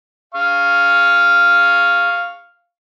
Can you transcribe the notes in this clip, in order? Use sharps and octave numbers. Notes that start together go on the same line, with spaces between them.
F5 C#6